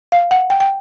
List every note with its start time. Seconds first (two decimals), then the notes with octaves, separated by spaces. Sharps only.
0.12 F5
0.31 F#5
0.50 G5
0.60 G5